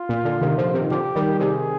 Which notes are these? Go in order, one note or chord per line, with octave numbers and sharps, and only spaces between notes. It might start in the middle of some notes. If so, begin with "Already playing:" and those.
Already playing: F4
A#2
A#2 D3
C3 D#3
D3 F3
C3 D#3
D3 F3 G4
D#3 G3
C3 D#3 G#4